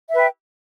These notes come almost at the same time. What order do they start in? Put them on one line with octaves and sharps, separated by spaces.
E5 B4 G5